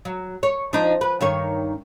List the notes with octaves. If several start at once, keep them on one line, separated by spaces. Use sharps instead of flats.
F#3
C#5
F3 D4 D#4
B4
G2 D#3 C#5